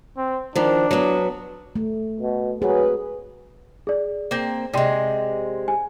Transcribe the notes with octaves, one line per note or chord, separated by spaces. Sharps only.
C4
D#3 F3 D4
F#3 B3
A3
B2
F#3 C4 F#4 G#4 B4
G#4 D5
A#3 C4
C3 G#3 D5 G5 C6
G#5